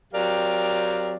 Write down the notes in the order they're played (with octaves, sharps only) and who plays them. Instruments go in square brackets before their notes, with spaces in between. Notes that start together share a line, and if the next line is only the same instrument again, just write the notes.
[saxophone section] F#3 C4 G4 A#4 D5 F5